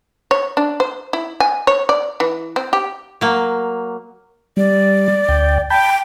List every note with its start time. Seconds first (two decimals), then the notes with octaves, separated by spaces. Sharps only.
0.31 C#5
0.57 D4
0.80 C5
1.13 E4
1.40 G#5
1.67 C#5
1.89 D5
2.20 E3
2.56 C4
2.73 G4
3.21 F#3 A#3
4.57 G3 D5
5.29 D2 G5
5.70 G5 A5 B5 G6